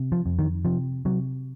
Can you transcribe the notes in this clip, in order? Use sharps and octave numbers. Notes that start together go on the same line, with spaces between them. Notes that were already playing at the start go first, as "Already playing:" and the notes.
Already playing: C3
F3
F2
D#3
C3 F3
C3 F#3